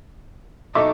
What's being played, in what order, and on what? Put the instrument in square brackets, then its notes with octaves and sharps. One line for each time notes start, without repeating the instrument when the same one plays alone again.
[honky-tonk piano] B1 C#6 D6 [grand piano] D#4 A4 E5 [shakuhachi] D#5